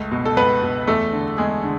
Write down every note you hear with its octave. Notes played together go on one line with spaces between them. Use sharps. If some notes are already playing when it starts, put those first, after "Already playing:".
Already playing: C#2 A3
B2
A4
C#2 B3 B4
B2
E2 A3 A4
D3
E2 G#3 G#4
D3